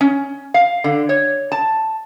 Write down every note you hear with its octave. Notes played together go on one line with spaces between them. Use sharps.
C#4
F5
D3
C#5
A5